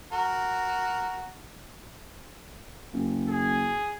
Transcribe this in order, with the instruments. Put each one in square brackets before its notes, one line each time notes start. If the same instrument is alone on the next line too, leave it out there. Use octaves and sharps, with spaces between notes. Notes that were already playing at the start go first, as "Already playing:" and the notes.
[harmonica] F#4 A#4
[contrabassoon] F#1
[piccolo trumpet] G#4